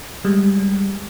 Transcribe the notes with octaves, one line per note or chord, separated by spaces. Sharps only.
G3 G#3